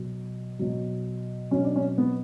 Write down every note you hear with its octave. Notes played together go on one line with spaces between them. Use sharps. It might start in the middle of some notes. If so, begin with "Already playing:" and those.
Already playing: B2 F#3
B2 F#3
B2 F#3 C#4
D4
C#4
B3